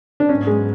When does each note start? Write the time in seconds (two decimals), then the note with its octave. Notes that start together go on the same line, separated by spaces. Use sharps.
0.20 D4
0.29 G#2 F#3 B3 C#4
0.47 G#3